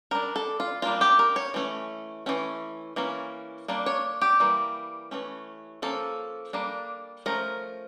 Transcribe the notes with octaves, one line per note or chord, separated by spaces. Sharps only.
G3 D4 A#4
A4
F4
G3 A#3 D4 F4
G4
A#4
C#5
E3 A3 C#4
E3 A3 C#4
E3 A#3 C#4
G3 A#3 D4
C#5
G4
E3 G3 A#3
E3 A3 C#4
F3 A#3 C#4 A4
G3 A#3 D4
F3 A3 C#4 A#4